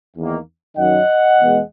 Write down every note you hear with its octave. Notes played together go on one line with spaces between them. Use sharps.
E2 D#3 A#3
F#2 D#3 F#3 D#5 F#5
E2 B2 G#3 B3